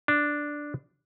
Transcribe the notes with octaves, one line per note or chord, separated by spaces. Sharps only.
D4